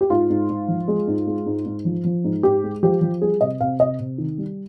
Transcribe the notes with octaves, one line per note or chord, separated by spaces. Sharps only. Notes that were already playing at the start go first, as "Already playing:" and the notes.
G4
G#2 F4
G#2
G#2
F3
G#3
G#2
G#3
G#2
G#2
F3
F3
G#2
G#2 G4
G#3
F3 G4
F3
G3 G#4
C3 D#5
C3 F5
C3 D#5
C3
D#3
G3